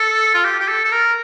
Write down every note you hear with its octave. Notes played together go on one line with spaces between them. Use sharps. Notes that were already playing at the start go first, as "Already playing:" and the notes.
Already playing: A4
F4
G4
G4
A4
A4
A#4